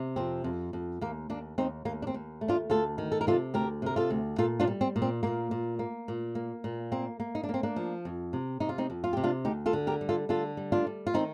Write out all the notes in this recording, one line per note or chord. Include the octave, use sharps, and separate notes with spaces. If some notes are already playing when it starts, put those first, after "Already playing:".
Already playing: C3
F2 C4
F2
F2
D#2 A#3
D#2 A#3 D4
D#2 C4 D#4
D#2 A#3
D4
C4
D#2
A3
D4 F4
D2 F4 A4
D#3
A4
A#4
C3 F4 A4
D2 G4 A#4
C3 A#4
F4 A4
D2
A#2 F4 A4
D4 F4
G3
C4
A#2
C4
A#2 A#3
A#2
A#3
A#2
A#3
A#2
A#3 C4
A#3
D#4
D4
A#3
C4
A#3 D4
F3
F2
C3
C3 D#4
F4
C4 D#4
F2
F4
C3 G4
D4 F4
D2 D#4 G4
F4 A4
D3
G4 A#4
G3
F4 A4
D3 F4 A4
G3
D4 F4
G3
F4
D#3 C4 D#4